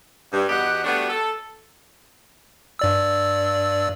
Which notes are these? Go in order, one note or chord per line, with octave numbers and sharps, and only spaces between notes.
G2
E2 B3 F#4 G4 D#5 F#5
G3 A3 B3 D4 F#4
A4
G2 D5 E6